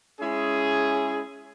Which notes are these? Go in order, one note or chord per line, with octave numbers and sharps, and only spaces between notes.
G#3 C#4 E4 G#4